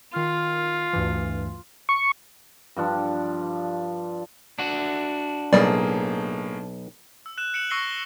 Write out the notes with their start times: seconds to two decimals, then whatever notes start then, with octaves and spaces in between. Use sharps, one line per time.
0.13 D#3 F4 F6
0.93 D2 G2 E3
1.89 C#6
2.76 G2 F3 D4
4.59 D4 F#4
5.53 B1 A2 G3 A#3 G#4 D5
7.26 E6
7.38 F#6 E7
7.54 F#6 C#7 D7 E7 F#7
7.70 C#6 E6 A#6 C7 C#7 G7
7.91 G7